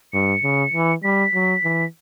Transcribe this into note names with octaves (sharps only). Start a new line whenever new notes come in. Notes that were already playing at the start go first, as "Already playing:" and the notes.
G2 C#7
C#3
E3
G3 B6
F#3
E3